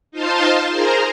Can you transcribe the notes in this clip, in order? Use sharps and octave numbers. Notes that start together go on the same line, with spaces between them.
D#4 F4 C5 F5 A5 C6
G#4 A#4 C5 A#5